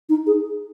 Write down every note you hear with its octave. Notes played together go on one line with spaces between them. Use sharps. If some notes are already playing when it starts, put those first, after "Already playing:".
D#4
G#4